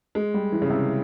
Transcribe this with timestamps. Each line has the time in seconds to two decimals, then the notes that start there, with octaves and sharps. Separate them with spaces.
0.15 G#3
0.34 G3
0.52 E3
0.62 C#3
0.70 C3